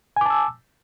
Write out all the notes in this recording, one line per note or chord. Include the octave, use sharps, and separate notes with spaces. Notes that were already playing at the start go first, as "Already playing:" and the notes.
G#5 A5 D6 E6